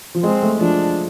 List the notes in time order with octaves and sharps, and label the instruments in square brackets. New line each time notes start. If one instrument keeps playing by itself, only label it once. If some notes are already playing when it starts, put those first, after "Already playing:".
[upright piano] F3
[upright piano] G#3 [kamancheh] C4
[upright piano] A3
[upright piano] F3 [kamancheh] D4